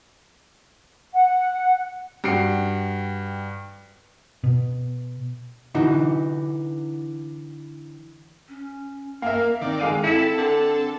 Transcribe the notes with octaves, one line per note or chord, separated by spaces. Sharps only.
F#5
G2 F#4 G5 C7 D7
B2
D3 E3 D#4 F#4
C#4
A#3 A#4 E5 F5
D#3 C4 D5
G#3 F5 D#7
E4 A4 E5
D3